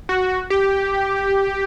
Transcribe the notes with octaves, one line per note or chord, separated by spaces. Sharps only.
F#4
G4